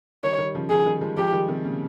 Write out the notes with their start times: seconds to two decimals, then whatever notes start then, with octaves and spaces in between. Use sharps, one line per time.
0.23 D#3 G3 C#5
0.38 D#3 G3
0.55 C#3 F3
0.70 C#3 F3 G#4
0.86 D#3 G3
1.01 F3 G#3
1.17 F3 G#3 G4
1.32 D#3 G3
1.48 C3 D#3
1.64 A#2 C#3